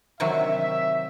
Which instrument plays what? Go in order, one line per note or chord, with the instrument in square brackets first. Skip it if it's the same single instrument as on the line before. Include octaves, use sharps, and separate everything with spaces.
[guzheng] C3 D#3 F#3 [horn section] E5